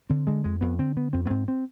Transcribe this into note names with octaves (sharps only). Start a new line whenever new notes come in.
D3 C4
D3 G#3
F2 G#3
F2 B3
D3 C4
D3 B3
F2 C4
B3
G#2 C4
C4